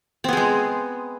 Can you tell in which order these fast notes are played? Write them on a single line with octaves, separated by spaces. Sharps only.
C4 B3 G#4 G#3